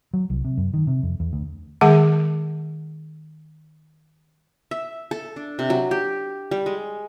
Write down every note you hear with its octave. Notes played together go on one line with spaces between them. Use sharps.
F#3
C2
C3
F#2
D#3
C3
F2
E2
D2
D#3 G#3 G#4 F#5
E5
A4
D4
C3
F#3
G4
G3
G#3